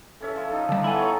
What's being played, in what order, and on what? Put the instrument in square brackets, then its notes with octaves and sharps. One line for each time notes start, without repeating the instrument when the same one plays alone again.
[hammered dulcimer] E3 C#4 E5 [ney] A4
[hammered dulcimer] F3
[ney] D#4 [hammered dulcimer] A4
[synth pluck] D3 G3 [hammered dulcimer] D4 D#4 [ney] A5
[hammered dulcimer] B3 [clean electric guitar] E4 G#5 [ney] A4
[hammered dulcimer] C#5 A#5 C#6